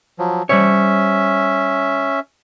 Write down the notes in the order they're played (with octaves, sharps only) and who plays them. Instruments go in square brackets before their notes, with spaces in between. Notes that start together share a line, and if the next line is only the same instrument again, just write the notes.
[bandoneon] F3 F#3
[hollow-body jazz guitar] G3 C5 C#5 [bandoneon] C#4 E5